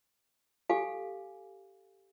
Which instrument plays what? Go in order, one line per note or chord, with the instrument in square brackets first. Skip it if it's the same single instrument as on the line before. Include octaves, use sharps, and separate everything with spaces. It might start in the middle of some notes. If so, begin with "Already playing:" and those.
[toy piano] G4 A4 F5 G#5 D6